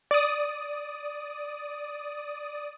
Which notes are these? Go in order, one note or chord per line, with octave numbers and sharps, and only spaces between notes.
D5 D#6